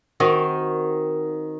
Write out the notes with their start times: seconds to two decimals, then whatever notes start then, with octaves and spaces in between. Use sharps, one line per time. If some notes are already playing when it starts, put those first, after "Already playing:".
0.20 D#3 C4 F#4